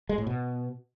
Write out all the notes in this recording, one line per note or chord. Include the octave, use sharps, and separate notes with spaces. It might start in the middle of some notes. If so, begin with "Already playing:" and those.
G#3
A2
B2